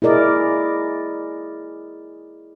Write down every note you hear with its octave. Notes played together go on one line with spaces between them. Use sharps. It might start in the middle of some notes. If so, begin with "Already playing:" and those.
E4 G#4 A#4 D5 D#5